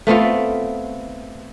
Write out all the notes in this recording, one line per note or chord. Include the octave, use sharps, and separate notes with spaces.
A3 B3 C4 F4